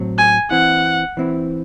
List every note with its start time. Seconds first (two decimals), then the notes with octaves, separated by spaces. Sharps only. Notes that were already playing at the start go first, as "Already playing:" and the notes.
Already playing: A2 F#3 C4
0.18 G#5
0.51 E3 C4 E4 F#5
1.17 E3 C4 E4